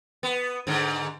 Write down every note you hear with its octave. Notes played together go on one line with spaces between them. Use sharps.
B3
G#2 D3